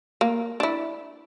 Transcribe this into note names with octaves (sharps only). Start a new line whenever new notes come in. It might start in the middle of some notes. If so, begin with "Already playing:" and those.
A#3
D4 E4